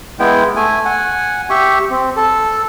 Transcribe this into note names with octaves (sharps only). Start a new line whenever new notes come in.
G#3 B3 E4 G5
A3 G#5
F#5 G#5
G4 E5 C#6
C4
A4